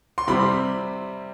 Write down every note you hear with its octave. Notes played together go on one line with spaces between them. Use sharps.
C6
C3 G3 C4 B5